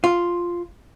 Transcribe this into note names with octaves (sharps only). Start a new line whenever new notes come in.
F4